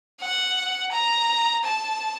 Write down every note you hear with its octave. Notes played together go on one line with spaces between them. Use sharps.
F#5
A#5
A5